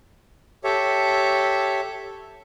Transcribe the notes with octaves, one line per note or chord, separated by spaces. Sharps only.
G4 A4 C#5 E5